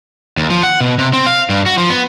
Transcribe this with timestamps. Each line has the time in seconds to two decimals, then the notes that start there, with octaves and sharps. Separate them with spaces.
0.37 D#2
0.50 F3
0.63 F#5
0.81 B2
0.99 C3
1.13 C4
1.26 F5
1.50 G2
1.66 F#4
1.78 F3
1.90 B3